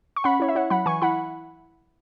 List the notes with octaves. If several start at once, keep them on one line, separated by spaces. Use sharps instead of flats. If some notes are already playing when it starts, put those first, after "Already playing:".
C#6
C#4 F#5 B5
E4 C#5
E5
E4 C#5 F#5
F#3 F#5 B5
E3 G#5 C#6
E4 F#5 B5